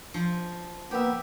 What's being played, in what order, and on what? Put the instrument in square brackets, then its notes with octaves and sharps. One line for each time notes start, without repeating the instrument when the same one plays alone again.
[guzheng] F3
[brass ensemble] A#3 B3 [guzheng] G4 E5